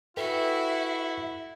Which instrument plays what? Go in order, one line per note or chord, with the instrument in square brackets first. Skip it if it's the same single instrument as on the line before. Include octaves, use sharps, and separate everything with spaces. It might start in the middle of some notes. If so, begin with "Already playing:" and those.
[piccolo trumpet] E4 [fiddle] F#4 [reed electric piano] A4 B4 G5 [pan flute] E5